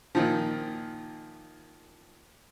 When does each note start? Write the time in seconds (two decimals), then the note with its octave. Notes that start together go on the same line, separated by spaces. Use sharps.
0.15 A#2 D#3 F3